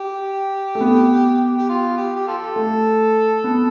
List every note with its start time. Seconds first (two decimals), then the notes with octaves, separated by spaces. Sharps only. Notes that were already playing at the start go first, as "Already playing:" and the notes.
Already playing: G4
0.75 A3
0.81 B3
1.58 G4
1.69 F4
1.97 G4
2.16 G4
2.27 F4 A4
2.56 A3
3.44 B3